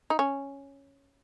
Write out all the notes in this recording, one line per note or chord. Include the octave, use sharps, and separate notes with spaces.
D#4
C#4